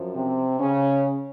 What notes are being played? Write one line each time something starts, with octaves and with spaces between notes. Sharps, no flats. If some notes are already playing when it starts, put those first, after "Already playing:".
Already playing: F#2 F3
C3 C4
C#3 C#4